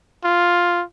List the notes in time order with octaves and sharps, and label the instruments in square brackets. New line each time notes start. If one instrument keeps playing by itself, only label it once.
[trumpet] F4